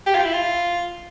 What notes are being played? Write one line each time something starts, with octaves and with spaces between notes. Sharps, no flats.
G4
F4
E4
F4